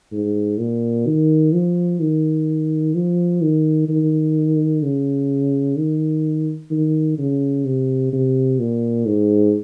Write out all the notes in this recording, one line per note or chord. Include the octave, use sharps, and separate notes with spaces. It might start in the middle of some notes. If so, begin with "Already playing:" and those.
G#2
A#2
D#3
F3
D#3
F3
D#3
D#3
C#3
D#3
D#3
C#3
C3
C3
A#2
G#2